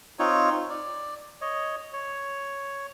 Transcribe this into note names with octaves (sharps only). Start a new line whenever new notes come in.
C4 D#4 F4 C#5
D5
C#5 D#5
C#5